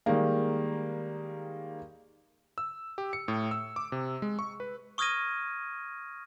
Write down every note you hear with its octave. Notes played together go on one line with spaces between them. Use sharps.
D#3 G3 G#3 A#3
E6
G4
C#7
A2
E6
D6
C3
G#3
C#6
B4
C#6 D#6 F6 G#6 A#6 D#7